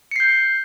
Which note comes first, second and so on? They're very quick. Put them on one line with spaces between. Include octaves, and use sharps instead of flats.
C#7 C7 G6